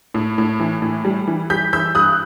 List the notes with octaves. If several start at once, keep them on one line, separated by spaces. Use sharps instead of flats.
A2
A2
E3
A2
G3
E3
G3 G6 B6
E3 E6 G6
G2 D#6 F#6